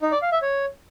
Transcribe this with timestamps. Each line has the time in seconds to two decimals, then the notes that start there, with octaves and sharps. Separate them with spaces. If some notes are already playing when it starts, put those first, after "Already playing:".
0.02 D#4
0.12 D5
0.22 F5
0.32 E5
0.42 C#5